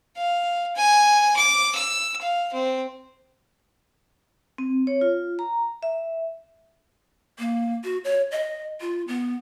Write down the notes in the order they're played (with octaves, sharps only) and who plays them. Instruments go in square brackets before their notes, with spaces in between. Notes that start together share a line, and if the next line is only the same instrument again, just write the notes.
[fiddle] F5
G#5
D6
E6
F5
C4
[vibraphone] C4
C#5
F4
A#5
E5
[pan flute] A#3
F#4
C#5
D#5
F4
B3